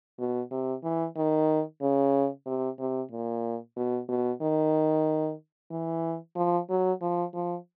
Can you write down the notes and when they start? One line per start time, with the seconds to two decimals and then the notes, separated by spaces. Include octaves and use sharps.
0.19 B2
0.51 C3
0.83 E3
1.16 D#3
1.82 C#3
2.46 C3
2.79 C3
3.12 A#2
3.77 B2
4.09 B2
4.42 D#3
5.71 E3
6.36 F3
6.70 F#3
7.01 F3
7.34 F3